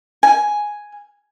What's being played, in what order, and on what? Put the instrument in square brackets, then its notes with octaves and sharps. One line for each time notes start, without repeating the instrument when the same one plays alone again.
[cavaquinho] G#5